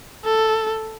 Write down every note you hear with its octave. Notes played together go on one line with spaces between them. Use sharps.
A4